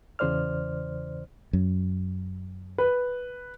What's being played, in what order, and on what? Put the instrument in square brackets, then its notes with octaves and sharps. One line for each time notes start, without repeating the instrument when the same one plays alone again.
[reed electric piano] E2 C#3 E3 C5 D5 F6
[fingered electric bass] F#2
[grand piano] B4